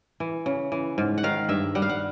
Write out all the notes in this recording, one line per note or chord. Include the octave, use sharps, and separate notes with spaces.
E3
C#3
E3
G#2
F#5
D#3 F5
G2 E5
G3 F#5
F5
F#5